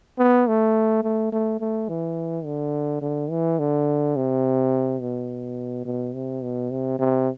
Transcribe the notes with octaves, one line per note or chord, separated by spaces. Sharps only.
B3
A3
A3
A3
A3
E3
D3
D3
E3
D3
C3
B2
B2
C3
B2
C3
C3